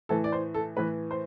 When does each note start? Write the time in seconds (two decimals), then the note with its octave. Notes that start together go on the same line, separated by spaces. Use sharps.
0.09 A2 E3 A4
0.24 D5
0.32 C5
0.54 A4
0.77 A2 E3 B4
1.11 C5